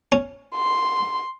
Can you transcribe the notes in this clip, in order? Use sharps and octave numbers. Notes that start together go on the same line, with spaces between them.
C#4
C6